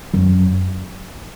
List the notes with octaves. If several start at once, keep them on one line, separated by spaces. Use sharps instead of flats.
F#2